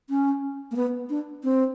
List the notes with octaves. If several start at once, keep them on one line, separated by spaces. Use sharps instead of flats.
C#4
A#3
B3
D4
C4